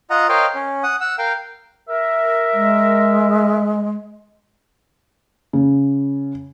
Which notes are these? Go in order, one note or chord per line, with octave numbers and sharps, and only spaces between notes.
F4 D#5 F#5 A#5
A#4 C5 C#5 D#5 F5 G5
C#4
F#5 D#6
F#5 E6
A#4 F5 G5
A#4 E5
G#3
C#3